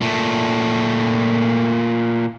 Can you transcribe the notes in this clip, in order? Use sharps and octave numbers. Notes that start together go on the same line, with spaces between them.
A#2 A3